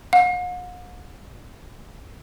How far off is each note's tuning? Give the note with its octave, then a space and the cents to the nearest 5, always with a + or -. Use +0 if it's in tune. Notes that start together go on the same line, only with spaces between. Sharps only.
F#5 -45